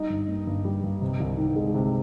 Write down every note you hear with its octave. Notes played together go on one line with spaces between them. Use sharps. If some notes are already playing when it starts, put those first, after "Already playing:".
Already playing: G3 D#4 D#5
G2
A#3
G2
G3
G2
C3
C2
D#3
G#3
C3